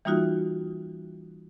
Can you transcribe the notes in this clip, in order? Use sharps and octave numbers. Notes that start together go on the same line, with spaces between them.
E3 G3 A#3 D#4 F4 F#4